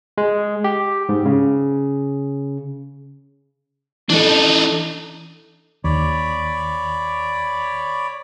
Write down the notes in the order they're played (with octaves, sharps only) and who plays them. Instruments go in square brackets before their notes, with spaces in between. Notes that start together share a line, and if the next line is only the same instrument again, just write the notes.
[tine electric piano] G#3
G4
G#2
C#3
[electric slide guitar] E3 A4 [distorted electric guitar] D4 D#4
[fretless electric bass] D#2 [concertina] C#5 D5 B5